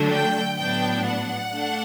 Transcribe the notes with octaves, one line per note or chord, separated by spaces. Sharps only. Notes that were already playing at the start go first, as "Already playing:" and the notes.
Already playing: D3 F#3 A3 D4
G5
A2 F#3 B3 D4 G5
F#5
A3 D4